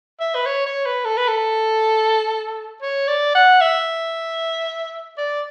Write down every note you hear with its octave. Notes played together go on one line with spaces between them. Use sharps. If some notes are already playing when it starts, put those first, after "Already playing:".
E5
B4
C#5
C#5
B4
A4
B4
A4
C#5
D5
F#5
E5
D5